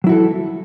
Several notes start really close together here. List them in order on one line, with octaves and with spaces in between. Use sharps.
F#3 E4 F#4 A4